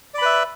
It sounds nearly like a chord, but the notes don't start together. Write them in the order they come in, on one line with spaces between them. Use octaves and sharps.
D5 B5 B4 E5